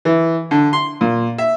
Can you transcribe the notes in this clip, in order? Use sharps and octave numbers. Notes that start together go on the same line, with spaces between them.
E3
D3
C6
A#2
E5